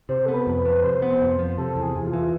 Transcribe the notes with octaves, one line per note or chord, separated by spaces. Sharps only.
C3 C5
B3 A4
B4
F2
B4
F3
C3 C5
B3
F2
F3
C3 A4
E2
G#4
E2
F4
E3